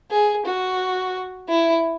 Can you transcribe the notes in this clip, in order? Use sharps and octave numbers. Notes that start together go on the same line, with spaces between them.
G#4
F#4
E4